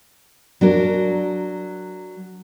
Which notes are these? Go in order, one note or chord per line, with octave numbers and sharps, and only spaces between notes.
F#3 D4 A#4